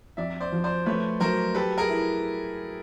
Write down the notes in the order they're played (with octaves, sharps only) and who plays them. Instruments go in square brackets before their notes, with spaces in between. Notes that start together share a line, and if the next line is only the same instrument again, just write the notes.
[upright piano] F2 [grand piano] D5 E5
[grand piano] C5 D5
[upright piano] F3
[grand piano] C5 D5
[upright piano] A3 [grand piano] B4 C#5
[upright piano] F#3 [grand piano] A#4 C5
[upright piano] G4 [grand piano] A4 B4
[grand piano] G#4 A#4
[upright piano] E4